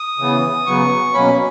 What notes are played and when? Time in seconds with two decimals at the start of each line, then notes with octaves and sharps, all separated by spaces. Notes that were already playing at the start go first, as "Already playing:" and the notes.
Already playing: D#6
0.19 C#3 E3 B3
0.66 C#3 F#3 B3 C#6
1.13 B2 F#3 A#3 C#4 B5